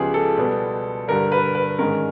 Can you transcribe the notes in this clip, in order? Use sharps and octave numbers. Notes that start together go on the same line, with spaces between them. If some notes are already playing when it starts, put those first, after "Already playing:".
Already playing: C#2 C#3 F3 G#3 B3 G4 G#4
A4
B2 G3 B3
G2 D3 G3 A#4
B4
B4
G#2 D#3 G#3 C#4 A#4